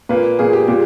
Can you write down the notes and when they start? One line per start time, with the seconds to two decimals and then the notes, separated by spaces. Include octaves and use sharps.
0.09 A#2 A#3 B4
0.39 A#2 A#3 G#4
0.53 G4
0.68 A#2 G#3 G4